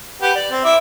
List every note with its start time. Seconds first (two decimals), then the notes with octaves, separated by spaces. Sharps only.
0.22 G4 B4 F#5
0.35 D5
0.52 C4
0.65 E4 E5 D6